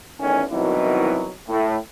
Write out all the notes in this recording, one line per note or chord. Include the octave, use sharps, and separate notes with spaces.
A1 E2 D#3 C#4 G#5
C2 B2 D#3 E3 F#3
A2